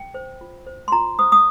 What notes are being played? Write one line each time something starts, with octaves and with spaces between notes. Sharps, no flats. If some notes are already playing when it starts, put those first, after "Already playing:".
Already playing: G5
C5
F4
C5
C6
F4 A#5
C5 D#6
D#6